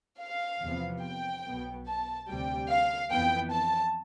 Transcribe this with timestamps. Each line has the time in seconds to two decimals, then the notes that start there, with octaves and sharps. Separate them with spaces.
0.20 F5
0.63 E2 C3 F3 B3
1.03 G5
1.45 B1 B2 B3
1.87 A5
2.28 D2 C3 G3 G5
2.69 F5
3.11 F2 E3 B3 G5
3.52 A5